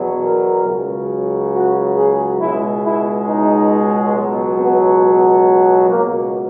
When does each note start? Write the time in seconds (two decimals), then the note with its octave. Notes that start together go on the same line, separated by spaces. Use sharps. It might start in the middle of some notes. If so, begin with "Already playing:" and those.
Already playing: E2 B2 F#3
0.23 A#4
0.67 C#2 C#3 F#3
1.54 F#4
1.97 G#4
2.40 C#2 B2 G#3 E4
2.84 E4
3.28 D#4
4.15 C#2 B2 F#3
4.59 B3
5.89 C#2 B2 F#3 A#3